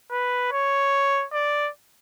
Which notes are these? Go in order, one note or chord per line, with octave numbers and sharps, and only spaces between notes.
B4
C#5
D5